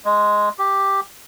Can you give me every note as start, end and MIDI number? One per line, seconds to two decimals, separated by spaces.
0.05 0.49 56
0.59 1.00 67